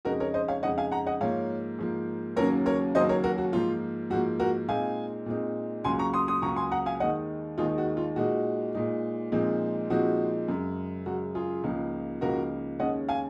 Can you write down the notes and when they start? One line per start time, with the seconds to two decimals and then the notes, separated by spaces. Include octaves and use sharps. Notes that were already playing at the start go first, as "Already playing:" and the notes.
0.05 F2 C#3 G#3 D#4 F#4 A#4
0.20 A#4 C#5
0.34 C5 D#5
0.48 C#5 F5
0.63 F2 C#3 G#3 D#4 D#5 F#5
0.78 F5 G#5
0.91 F#5 A#5
1.06 D#5 F#5
1.21 G#2 F3 A#3 C#5 F5
1.79 G#2 F3 A#3
2.36 D#2 C#3 F#3 A#3 C#4 A#4 C#5
2.66 A#4 C#5
2.95 D#2 C#3 F#3 A#3 C#4 C5 D#5
3.09 A#4 C#5
3.24 F#4 A#4
3.38 F#4
3.52 G#2 F3 A#3 F4
4.10 G#2 F3 A#3 F#4
4.40 F#4 A#4
4.68 A#2 G#3 C4 D#4 F5 G#5
5.26 A#2 G#3 C4 D#4
5.84 C#2 C#3 F#3 A#3 G#5 C6
5.99 A#5 C#6
6.13 C6 D#6
6.28 C6 D#6
6.42 C#2 C#3 F#3 A#3 A#5 C#6
6.56 G#5 C6
6.71 F#5 A#5
6.86 F5 G#5
7.00 D#2 D#3 G#3 D#4 D#5 F#5
7.58 D#2 D#3 G#3 D#4 F4 G#4
7.78 F#4
7.97 F4
8.16 A#2 G#3 D#4 F#4
8.74 A#2 G#3 D#4
9.32 A#2 F3 G#3 C4 D#4
9.90 A#2 F3 G#3 C4 D#4 F#4
10.48 F#2 C#3 G#3
11.06 F#2 C#3 G#3 F#4
11.35 F4 G#4
11.64 C#2 C#3 F3 A#3 D#4
12.21 C#2 C#3 F3 A#3 D#4 F#4 A#4
12.79 D#2 C#3 G#3 C#4 D#5 F#5
13.09 F5 G#5